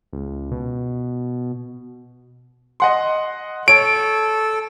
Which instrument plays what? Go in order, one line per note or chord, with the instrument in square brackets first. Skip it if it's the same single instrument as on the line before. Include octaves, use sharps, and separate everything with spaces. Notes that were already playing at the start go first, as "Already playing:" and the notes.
[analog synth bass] C#2
B2
[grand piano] D#5 F#5 C6
[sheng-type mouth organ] A4 [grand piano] C#5 [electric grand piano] D7